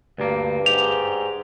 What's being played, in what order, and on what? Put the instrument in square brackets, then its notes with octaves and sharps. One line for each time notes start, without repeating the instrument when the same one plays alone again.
[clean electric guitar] D2 A#3 [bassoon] G2
[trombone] G#2 [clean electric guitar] G4 [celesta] F7